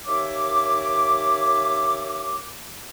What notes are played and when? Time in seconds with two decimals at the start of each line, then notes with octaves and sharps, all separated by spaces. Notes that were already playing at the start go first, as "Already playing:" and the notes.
0.05 D#2 C#5 E5 D6